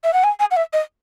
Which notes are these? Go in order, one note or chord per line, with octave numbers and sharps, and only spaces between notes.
E5
F#5
G#5
G#5
F#5
E5
D#5